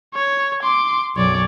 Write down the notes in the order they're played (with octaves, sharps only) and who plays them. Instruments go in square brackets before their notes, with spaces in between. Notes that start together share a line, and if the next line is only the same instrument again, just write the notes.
[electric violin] C#5
C6 D6
[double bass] B1 F#2 [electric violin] C#5 D5